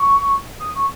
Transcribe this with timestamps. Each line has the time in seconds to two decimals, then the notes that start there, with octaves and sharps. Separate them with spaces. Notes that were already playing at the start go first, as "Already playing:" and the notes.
Already playing: C#6
0.59 D#6
0.75 C#6